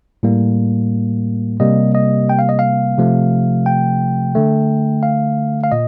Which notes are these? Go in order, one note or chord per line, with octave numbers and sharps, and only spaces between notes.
A2 G3 A#3
C3 G3 A#3 D#5
D#5
G5
F5
D#5
F5
C3 F3 A3
G5
D3 A3
F5
F5
A#2 D#5